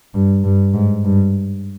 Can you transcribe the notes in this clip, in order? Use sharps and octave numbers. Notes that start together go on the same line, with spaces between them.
G2
G2
G#2
G2